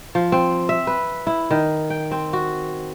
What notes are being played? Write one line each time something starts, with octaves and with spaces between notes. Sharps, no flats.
F3
C4
E5
B4
E4
D#3
G5
C4
F#4